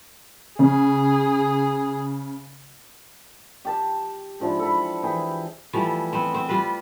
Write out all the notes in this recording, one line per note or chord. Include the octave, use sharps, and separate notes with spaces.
C#3 G#4
G4 A5
G#2 F3 D4 E4
A4 B5
E3 G4 G#4 B4
E3 F3 G3 A3
B3 C4
C4
G3 F4 B4